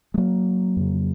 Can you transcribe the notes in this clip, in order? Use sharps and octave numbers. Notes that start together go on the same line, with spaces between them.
G#3
F#3 A#3
F2 C#3